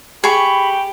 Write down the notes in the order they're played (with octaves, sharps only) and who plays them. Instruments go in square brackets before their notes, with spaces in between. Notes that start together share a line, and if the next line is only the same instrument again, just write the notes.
[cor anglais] G4 [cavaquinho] G#4 C#6 [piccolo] B5